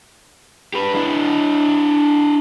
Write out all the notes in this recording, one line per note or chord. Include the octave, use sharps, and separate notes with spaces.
G4 B4
D4 E4